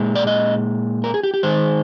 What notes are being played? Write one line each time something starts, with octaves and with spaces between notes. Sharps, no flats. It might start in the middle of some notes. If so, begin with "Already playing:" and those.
Already playing: A#2 G#3
D5
D#5
A#4
G#4
G4
G4
D#3 G#3 C5